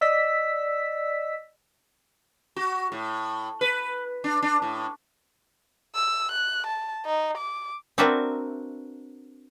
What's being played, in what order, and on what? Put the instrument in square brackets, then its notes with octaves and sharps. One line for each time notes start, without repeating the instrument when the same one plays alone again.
[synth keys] D5 D#5 E6 B6
[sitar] F#4
A2
B4
D4
D4
A2
[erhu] E6
F#6
A5
D#4
D6
[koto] C4 D4 F#4 A#4 B4 E5